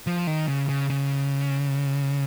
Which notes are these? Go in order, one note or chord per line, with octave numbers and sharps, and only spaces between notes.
F3
D#3
C#3
C#3
C#3